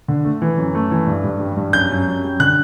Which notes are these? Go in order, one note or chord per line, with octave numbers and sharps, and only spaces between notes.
D3
A3
E3
F#2
A3
E3
G2
G2
G3
G2
F#2 G6
F#2
F#2
G3
D3 F#6